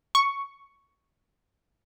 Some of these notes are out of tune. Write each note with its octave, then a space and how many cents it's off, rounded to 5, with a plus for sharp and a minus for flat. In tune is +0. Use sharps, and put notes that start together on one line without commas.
C#6 +5